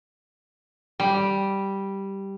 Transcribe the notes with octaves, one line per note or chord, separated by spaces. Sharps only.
G3